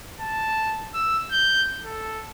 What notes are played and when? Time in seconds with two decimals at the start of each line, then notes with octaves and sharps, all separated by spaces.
0.20 A5
0.94 E6
1.31 G6
1.83 A4